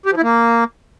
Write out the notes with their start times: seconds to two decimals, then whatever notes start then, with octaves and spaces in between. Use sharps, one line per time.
0.06 G4
0.12 F3
0.17 E4
0.23 A#3